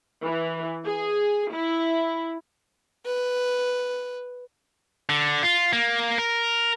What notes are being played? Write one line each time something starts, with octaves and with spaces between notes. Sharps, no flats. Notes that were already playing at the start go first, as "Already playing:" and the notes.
E3
G#4
E4
B4
D3
F4
A#3
A#4